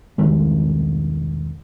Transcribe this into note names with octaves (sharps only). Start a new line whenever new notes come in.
E1 C2 D#3 G#3